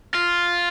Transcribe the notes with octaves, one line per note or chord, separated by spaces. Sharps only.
F4